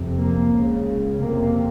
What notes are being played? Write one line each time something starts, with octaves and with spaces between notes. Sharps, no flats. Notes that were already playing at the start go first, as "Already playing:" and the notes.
Already playing: F2 C3
A#3
C#2 C#3
F2 C3 A#3